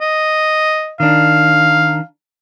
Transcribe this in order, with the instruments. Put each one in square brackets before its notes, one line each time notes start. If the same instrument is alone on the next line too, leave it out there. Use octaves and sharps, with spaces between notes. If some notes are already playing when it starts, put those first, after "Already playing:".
[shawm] D#5
[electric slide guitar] D#3 D4 [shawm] F5